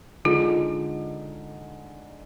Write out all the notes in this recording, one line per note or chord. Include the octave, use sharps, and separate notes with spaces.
D3 G#3 D#4 F4